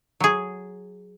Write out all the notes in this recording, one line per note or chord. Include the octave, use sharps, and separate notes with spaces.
F#3 G#4